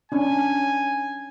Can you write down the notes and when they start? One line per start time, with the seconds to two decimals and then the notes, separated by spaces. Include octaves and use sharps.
0.12 C#4 D4 G#5